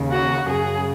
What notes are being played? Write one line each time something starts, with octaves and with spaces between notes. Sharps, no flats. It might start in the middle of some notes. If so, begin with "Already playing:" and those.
Already playing: D#2 C#3
F#4
F#2 C#3 G#4